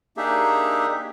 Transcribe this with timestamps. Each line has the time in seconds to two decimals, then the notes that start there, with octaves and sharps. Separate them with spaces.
0.17 A#3 D4 D#4 G4 G#4 E5